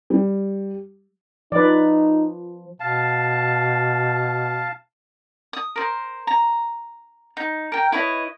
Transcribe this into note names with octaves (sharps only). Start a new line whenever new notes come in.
G3
F3 D#4 B4 D5
B2 F5 A5
D#6
A#4 C5
A#5
D#4
A#4 G5
E4 B4 C#5 D#5